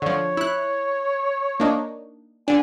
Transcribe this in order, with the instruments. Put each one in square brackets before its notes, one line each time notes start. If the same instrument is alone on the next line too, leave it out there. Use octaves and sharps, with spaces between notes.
[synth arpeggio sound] D3 F3 [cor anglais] C#5
[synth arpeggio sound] E4 F#6
A#3 D4 D#4
[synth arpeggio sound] D3 D4 [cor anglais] G#5